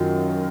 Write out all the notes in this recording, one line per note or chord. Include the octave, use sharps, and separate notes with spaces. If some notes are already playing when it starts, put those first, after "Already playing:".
Already playing: F#2 D#3 F#3 F4